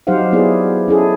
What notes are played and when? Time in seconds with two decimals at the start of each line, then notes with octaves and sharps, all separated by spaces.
0.07 F#3 D#4 G4 C5 F5 F#5
0.33 B3 E4 G#4 D5
0.88 C#4 E4 G#4 A4